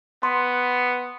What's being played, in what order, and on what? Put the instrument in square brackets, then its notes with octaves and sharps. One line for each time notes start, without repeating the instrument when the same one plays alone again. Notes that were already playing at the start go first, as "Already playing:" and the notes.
[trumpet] B3 [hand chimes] C6